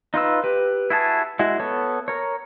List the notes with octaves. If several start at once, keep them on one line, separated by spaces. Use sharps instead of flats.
D#4 F4 B4 E6
G4 B4
E4 F#4 G#4 A5
G#3 E4 F#4
B3 A4 C#5
A#4 C#5